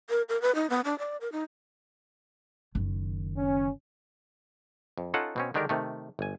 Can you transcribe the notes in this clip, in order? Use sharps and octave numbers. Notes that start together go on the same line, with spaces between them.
A#4
A#4
B4
D#4
B3
D4
D5
A#4
D#4
F#1 D#3
C#4
F2
C#4 D#4 F4 A4 F#5 A5
B2 C4 C#4
D3 D#3 G#3 D4 G4 A#4
C3 D#3 A3
G1 G#5